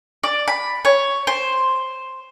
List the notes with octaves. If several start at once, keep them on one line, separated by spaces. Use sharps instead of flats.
D5
B5
C#5
C5